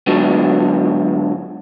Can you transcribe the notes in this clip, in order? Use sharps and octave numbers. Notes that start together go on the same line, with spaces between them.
G#2 D3 F#3 B3